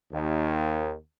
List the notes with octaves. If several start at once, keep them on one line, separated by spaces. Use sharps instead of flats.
D#2